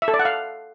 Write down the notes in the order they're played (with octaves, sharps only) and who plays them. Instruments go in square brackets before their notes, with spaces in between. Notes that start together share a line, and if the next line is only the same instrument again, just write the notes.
[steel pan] E5
A4
D5
F#5
F5